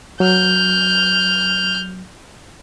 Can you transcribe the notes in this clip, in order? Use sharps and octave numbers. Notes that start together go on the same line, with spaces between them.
F#3 F6 G6